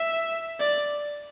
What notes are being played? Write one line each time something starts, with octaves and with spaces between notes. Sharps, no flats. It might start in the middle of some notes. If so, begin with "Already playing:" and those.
Already playing: E5
D5